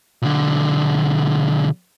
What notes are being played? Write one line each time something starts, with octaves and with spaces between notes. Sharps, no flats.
B1 D3